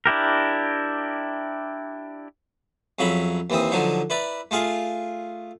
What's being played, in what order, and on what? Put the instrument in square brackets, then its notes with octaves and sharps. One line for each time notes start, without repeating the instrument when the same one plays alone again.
[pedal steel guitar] D4 E4 G4 A#4
[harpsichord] F2 C#3 F#3 E5 B5
D#2 E3 C4 D#6
D3 F3 F#3 D#4
E4 B4 D5 A#5
A3 F4 G#4 F5